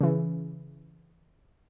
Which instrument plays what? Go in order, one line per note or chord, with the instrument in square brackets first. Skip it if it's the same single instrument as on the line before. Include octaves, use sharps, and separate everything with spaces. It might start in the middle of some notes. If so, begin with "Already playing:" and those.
[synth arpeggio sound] C#3 E3